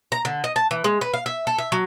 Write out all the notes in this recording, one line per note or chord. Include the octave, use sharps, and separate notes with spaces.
A#5
D3
D#5
A5
E3
G#3
B4
F5
E5
A4
E5
F#3